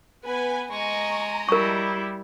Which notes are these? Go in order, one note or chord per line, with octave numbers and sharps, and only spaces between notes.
B3 B4 G#5
G#3 D#5 A#5 C#6
G3 E4 A#4 C#6